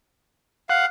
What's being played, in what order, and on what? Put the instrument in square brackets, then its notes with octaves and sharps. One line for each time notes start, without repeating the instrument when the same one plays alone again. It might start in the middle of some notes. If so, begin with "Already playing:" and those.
[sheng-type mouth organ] F5 [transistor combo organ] F#5